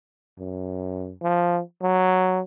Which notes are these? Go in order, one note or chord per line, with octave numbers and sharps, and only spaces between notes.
F#2
F3
F#3